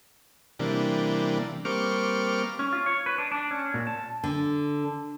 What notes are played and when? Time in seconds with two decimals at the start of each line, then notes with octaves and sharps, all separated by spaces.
0.59 C3 E3 G3 A#3 D4
1.65 G3 A#3 C4 C#6 D6 F6
2.59 C#4
2.73 F4
2.86 C#5
3.06 B4
3.18 D4
3.31 D4
3.51 C#4
3.74 A#2
3.87 A5
4.24 D3